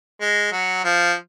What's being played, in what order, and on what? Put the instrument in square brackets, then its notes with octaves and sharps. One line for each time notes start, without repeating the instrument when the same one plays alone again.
[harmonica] G#3
F#3
F3